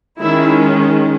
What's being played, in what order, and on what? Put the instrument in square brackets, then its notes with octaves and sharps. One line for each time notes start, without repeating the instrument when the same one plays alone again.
[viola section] D#3 G#3 C#4 E4